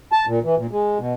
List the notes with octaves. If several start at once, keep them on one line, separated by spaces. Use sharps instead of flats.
A5
A#2
E3
A#2
G#3
B2